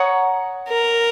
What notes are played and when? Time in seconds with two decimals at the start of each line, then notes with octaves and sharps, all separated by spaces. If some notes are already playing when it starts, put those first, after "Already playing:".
Already playing: C#5 F#5 A#5 D#6
0.69 A#4